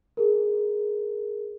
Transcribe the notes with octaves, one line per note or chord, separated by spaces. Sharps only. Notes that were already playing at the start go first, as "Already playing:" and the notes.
G#4 A#4